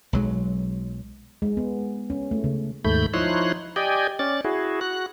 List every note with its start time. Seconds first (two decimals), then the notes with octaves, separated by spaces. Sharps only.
0.13 B1 F#3 G#3
1.42 G#3
1.57 B3
2.10 C#4
2.31 A3
2.44 C#3
2.85 D#2 G#2 A3 B5 G6
3.14 F3 D#4 E4 C#5 C6 F#6
3.76 G4 D5 D#5 G5 G#5
4.19 C#4 D5 A6
4.45 E4 F#4 G#4
4.81 F#4 F#6